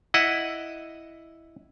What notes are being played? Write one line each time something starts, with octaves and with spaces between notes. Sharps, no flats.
E4 D#5 F#5